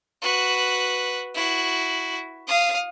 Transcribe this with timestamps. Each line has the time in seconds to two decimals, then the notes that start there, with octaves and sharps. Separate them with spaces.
0.22 F#4 B4
1.34 E4 F#4
2.47 F5 D#6